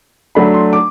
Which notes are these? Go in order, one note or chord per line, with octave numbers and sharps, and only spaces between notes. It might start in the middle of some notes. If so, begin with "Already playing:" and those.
F#3 A3 D4 B5
C6
D6